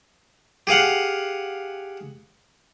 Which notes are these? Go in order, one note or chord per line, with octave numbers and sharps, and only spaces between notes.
G4 G#4 F5 F#5